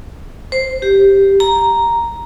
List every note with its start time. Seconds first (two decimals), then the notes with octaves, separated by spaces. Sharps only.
0.52 C5
0.82 G4
1.40 A#5